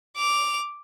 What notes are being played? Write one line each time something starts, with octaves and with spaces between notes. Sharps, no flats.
D6 F7